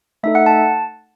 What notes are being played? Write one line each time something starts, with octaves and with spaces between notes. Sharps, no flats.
A3 D#4 A4 E5
F#5
A5